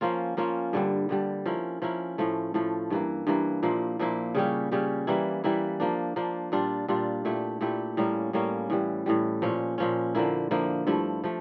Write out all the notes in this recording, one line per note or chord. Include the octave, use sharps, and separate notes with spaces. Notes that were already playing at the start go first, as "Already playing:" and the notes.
F3 A#3 C#4 F4
F3 A#3 C#4 F4
G2 D3 G3
G2 D3 G3
F3 C#4 E4 A#4
F3 C#4 E4 A#4
A2 F3 A3
A2 F3 A3
G2 E3 A#3
G2 E3 A#3
A#2 F3 A#3 E4
A#2 F3 A#3 E4
C#3 G3 C#4 G4
C#3 G3 C#4 G4
E3 G3 A#3 E4
E3 G3 A#3 E4
F3 A#3 D4
F3 A#3 D4
A#2 G3 D4 F4
A#2 G3 D4 F4
A#2 A3 E4 G4
A#2 A3 E4 G4
A2 G3 A#3 C#4
A2 G3 A#3 C#4
A2 E3 G3
A2 E3 G3
A#2 F3 C#4
A#2 F3 C#4
D3 F3 A#3 E4
D3 F3 A#3 E4
G2 F3 A3 E4
F3 A3